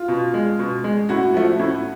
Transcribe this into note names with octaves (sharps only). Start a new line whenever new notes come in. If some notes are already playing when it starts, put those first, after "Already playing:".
Already playing: F4
B2
G#3
B2
G#3
A2 F#4
F3 A3
A2